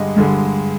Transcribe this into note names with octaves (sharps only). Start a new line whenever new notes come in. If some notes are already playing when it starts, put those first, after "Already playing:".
Already playing: G2 D3 G#3 D#5
G2 D3 G#3